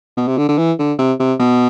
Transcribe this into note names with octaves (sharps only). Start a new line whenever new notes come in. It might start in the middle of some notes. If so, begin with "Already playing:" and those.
B2
C3
D3
D3
E3
D3
C3
C3
B2